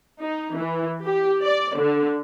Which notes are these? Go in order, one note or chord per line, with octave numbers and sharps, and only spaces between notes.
D#4
E3
G4
D5
D3